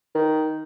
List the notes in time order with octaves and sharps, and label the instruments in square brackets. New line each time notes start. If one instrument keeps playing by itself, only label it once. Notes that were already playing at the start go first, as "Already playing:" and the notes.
[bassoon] D#3